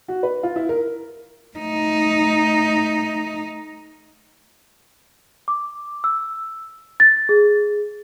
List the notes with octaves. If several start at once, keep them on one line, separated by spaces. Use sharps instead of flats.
F#4
B4
F4
E4
A#4
A3 D#4
D6
E6
A6
G#4